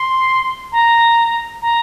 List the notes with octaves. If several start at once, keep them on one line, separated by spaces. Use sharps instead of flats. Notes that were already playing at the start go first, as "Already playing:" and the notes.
Already playing: C6
A#5
A#5